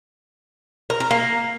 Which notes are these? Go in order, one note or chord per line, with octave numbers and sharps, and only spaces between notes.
A#4
A#4
A#3